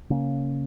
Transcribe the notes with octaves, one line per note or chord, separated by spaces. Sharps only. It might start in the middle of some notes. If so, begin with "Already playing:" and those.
C#3 A#3 C#4